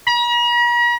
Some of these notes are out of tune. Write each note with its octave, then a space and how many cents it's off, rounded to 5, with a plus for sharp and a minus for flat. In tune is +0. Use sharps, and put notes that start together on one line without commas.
A#5 +45